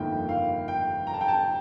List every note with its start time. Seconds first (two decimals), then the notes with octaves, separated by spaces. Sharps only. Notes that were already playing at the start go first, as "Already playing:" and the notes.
Already playing: G1 F2 D#3 A#3 G5
0.29 F5
0.68 G5
1.07 A#5
1.14 A5
1.21 G5
1.28 A5